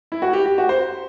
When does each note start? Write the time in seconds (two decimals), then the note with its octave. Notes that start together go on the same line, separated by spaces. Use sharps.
0.12 E4
0.22 F#4
0.33 G4
0.46 G4
0.58 F#4
0.69 C5